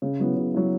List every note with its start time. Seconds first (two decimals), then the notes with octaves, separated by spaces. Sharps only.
0.02 C#3
0.20 F#3 B3 E4
0.36 C#3
0.54 F#3 B3 E4